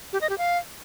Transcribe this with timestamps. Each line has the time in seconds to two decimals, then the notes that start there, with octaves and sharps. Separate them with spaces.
0.13 G4
0.21 D#5
0.30 G4
0.38 F5